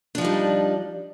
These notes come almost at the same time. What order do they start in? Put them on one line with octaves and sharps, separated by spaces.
D4 F3 D#4 G3